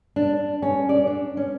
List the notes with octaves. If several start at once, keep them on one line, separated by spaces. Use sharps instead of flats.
D4
C#4
D5
D4
C#4